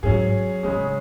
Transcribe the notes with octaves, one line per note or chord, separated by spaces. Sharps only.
G#2 F#3 C#4 G#4
G#2 C#3 G#3 C#4 G#4